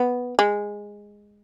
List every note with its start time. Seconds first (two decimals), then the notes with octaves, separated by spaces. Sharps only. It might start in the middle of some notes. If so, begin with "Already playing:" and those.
Already playing: B3
0.39 G#3